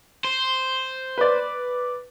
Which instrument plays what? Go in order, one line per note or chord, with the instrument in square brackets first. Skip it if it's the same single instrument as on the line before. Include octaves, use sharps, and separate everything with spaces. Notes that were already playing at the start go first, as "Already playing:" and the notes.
[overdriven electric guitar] C5
[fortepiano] B4 D5